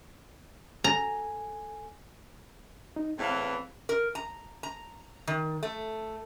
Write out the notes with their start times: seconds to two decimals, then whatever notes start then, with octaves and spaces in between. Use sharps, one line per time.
0.84 A4 G#5 A#5
2.96 D#4
3.19 E2 A2 E3 C4 F5
3.89 A#4
4.15 A#5
4.63 A#5
5.27 D#3
5.63 A3